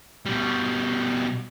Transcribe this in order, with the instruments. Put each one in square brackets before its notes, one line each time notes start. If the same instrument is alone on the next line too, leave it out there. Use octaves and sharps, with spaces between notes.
[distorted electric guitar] B2 G3